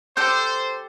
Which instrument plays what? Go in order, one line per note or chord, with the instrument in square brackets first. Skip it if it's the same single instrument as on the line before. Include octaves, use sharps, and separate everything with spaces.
[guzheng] G4 A4 D5 [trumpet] C5 [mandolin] G6